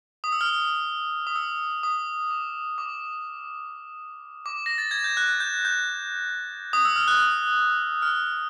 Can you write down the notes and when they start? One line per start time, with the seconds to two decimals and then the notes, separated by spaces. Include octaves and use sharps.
0.24 D#6
0.32 E6
0.41 F6
1.27 D#6
1.36 E6
1.83 D#6
2.31 D6
2.78 D6
4.46 D6
4.66 A#6
4.78 A6
4.91 G#6
5.04 G6
5.17 F#6
5.40 G6
5.65 G6
6.73 D#6
6.85 E6
6.96 F6
7.08 F#6
8.02 F6